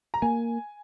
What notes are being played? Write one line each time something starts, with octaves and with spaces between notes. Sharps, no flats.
A#5
A#3 G#5